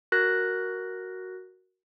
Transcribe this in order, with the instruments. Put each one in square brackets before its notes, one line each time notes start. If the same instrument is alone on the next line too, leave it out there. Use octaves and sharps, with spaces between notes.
[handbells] F#4 A#4 F#6 A#6